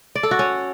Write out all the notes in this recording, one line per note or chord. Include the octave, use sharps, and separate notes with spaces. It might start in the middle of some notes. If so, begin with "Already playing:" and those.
D5
A4
F#4
C#4